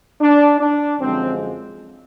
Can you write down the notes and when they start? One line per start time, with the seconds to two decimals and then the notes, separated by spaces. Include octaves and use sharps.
0.21 D4
0.60 D4
0.99 F#2 D3 F3 G#3 C4